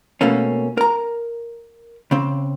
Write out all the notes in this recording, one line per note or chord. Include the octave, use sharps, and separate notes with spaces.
B2 A3 A#3 C#4
A#4 A#5
C#3 C4